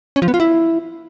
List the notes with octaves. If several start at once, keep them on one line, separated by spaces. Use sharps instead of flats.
C#4
F3
B3
F4
E4